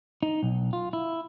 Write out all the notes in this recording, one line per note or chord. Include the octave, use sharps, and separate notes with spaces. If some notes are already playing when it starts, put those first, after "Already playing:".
D#4
B1
F4
E4